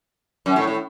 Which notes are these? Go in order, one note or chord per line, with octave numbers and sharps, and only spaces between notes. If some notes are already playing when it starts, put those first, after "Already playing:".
F#2
A2
A2